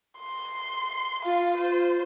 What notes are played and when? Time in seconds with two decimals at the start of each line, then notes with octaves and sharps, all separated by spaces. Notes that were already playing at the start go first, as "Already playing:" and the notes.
0.19 C6
1.25 F4 F5
1.57 C5